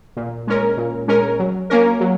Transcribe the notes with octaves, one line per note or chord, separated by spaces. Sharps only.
A#2
G#3 C#4 A#4
A#2
G#3 C#4 A#4
F#3
A#3 C#4 A#4
F#3